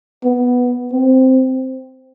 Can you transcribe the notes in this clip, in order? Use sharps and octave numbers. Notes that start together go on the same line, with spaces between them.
B3
C4